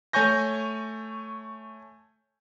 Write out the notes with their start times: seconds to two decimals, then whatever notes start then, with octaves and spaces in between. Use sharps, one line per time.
0.13 A3 C#5 G#5 C#6 G6 A#6